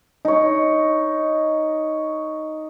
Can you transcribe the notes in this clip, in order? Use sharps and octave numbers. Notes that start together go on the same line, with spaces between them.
D#4 C#5